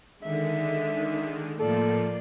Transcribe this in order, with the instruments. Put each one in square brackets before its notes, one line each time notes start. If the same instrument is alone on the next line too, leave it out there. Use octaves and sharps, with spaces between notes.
[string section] D3 G#3 [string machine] D#3 [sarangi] E5
[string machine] A2 F3 [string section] A#3 F4 [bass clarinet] A4 [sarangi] D5